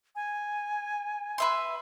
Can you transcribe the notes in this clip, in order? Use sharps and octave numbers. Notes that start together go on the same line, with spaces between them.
G#5
B4 E5 C6